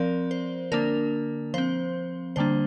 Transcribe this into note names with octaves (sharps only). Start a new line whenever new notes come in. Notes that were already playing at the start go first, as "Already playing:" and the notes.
Already playing: F3 C4 A#4 D5
C5
D3 A#3 D4 A#4
F3 C4 C5
D3 G3 A#3 D4 C5